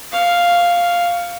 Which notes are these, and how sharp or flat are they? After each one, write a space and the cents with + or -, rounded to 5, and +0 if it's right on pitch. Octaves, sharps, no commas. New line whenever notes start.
F5 +0 C#6 +20